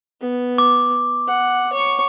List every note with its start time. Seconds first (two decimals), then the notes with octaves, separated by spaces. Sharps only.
0.21 B3
0.58 D6
1.28 F#5
1.73 C#5 C#6